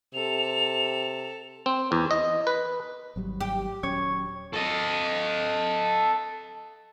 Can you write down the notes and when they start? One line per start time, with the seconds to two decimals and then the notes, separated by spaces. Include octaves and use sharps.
0.14 C3 A4 F7
1.66 C4
1.92 E2
2.11 D#5
2.47 B4
3.16 G#1 F#3 G3
3.40 G4
3.83 D#1 F#3 C#4 C#5
4.53 A4 D#5